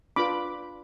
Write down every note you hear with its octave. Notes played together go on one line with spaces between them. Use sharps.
D4 F4 B4 B5 D6